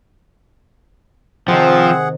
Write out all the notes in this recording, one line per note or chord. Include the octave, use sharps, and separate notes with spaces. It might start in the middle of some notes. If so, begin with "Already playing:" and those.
C3 D#3 F3 C4 G#4 F#5